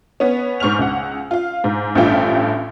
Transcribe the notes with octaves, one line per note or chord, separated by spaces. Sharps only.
B3 C#4
G#2 C#6 F6 F7
C#2 F#5
F4 F5
G#2
A1 G2 F3 A3 F4 G5